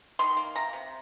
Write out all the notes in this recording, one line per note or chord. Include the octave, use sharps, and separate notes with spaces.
D#3 C6
A#3
C3 A#5
C3